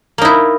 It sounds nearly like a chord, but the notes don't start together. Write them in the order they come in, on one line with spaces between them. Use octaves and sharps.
A#3 D#4 E4